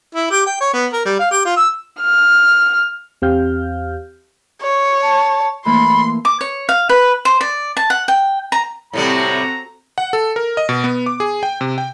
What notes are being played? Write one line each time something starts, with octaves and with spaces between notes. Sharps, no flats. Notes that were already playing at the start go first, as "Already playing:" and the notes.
E4
G4
G5
C#5
B3
A#4
G3
F5
G4
F4
E6
F6
E2 C4 G4 F5 F6 G6
C#5
A5
E3 A3 A#3 B5 C6
D6
C#5
F5
B4
C5
D5
A5
F#5
G5
A#5
A2 C3 G3 C4 F#4 A4 A#5
F#5
A4
A#4
D#5
B2
B3
D6
G#4
G5
C3
G5